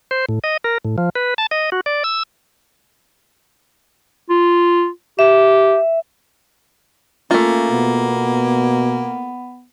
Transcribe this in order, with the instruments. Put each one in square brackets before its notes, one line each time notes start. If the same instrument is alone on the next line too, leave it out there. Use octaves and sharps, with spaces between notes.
[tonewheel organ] C5
A2
D#5
A#4
A2
F3
B4
A5
D#5
F#4
D5
E6
[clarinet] F4
[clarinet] G4 [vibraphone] E5
[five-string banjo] A3 F4 [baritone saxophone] A#3 [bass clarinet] C#4
[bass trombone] B2 [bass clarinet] B3